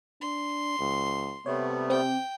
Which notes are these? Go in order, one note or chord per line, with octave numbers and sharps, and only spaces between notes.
D4 C6
C#2
C3 G3 A3 B3 C#5
C4 G4 G5